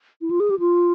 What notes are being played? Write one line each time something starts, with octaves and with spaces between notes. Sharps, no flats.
E4
F4
G#4
G4
F4